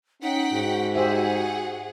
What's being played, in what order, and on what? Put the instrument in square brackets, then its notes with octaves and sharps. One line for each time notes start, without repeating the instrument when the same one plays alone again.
[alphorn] C#4 [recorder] D#4 [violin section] F#5 G5 B6
[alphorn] G#2 [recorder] F#4
[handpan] G4 C5 E5 [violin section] G#4 F#5